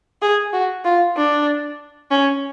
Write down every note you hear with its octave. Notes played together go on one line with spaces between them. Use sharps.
G#4
F#4
F4
D4
C#4